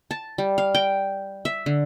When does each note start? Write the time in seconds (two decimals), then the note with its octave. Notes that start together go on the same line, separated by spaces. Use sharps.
0.11 A5
0.38 G3
0.58 F5
0.75 G5
1.45 E5
1.66 D3